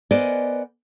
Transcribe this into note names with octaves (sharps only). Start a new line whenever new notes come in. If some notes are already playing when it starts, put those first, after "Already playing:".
B3 A#4 C5 D5 D#5 G#5